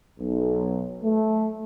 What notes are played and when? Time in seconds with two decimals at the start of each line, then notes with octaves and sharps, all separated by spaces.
0.19 B1
1.03 A3